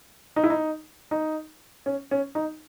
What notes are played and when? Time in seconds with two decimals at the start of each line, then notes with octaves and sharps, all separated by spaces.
0.36 D#4
0.44 E4
0.50 D#4
1.11 D#4
1.86 C#4
2.11 C#4
2.35 D#4